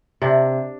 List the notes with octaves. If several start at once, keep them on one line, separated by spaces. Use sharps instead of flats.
C3 D4